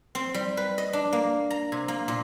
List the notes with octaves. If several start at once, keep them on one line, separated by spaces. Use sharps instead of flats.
C4
G3
B4
D#5
D4
A#3
A#5
C3
A#3
A#2